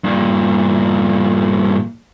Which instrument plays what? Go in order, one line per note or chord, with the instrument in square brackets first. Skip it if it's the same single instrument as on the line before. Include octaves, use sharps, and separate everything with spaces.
[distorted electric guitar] G2 A#2